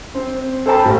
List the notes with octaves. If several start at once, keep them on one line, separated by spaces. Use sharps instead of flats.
C4
A4 C5 G5 A5 B5
A1